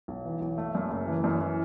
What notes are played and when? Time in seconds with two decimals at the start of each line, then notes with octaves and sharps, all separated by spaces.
0.08 B1
0.25 E3
0.41 B1
0.58 A3
0.75 F#2
0.90 F#1
1.07 E3
1.24 F#2
1.41 E3